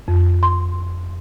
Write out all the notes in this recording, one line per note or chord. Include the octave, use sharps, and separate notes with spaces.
F2
C6